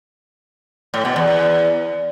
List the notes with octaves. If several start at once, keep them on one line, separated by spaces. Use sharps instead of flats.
A2
B2
E2